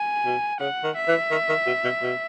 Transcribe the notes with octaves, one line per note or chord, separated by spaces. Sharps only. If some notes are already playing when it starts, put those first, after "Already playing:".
Already playing: G#5
B2
C#3 F#5
D#3
E5
E3
D#3
D#3
B2
B2
B2